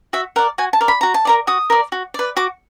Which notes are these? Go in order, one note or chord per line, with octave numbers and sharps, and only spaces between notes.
F#4 E5
A#4 D5 F#5
F#4 G#5
A5
A#4 D5
B5
F#4 A#5
A5
A#4 D5 A#5
F#4 D#6
A#4 D5
F#4
B4 D5
F#4 D6